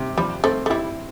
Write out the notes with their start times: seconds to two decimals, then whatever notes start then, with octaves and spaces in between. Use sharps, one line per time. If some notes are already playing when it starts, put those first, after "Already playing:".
Already playing: C3
0.18 F3 G3
0.44 A3 C4
0.66 A3
0.70 G3 E4